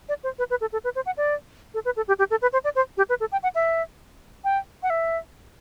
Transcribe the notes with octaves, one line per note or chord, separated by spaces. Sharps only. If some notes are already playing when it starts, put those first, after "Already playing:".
D5
C5
B4
B4
A4
A4
B4
C5
F#5
D5
A4
B4
A4
G4
G4
A4
B4
C5
D5
C5
G4
B4
A4
G5
F#5
E5
G5
F#5
E5